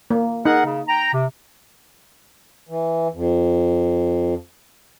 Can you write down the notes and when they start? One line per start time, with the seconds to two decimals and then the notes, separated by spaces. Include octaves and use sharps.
0.10 A#3
0.46 D#4 G#4 A#4 F#5
0.65 C#3
0.88 G5 A#5
1.13 C3
2.69 E3
3.14 F2